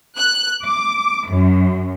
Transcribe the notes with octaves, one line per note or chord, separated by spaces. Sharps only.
F#6
D6
F#2